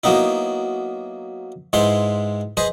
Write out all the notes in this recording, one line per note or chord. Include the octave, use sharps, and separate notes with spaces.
F#3 A#3 B3 D#4 E4
G#2 G#3 E4 B4 C6
G#4 B4 C5 D#5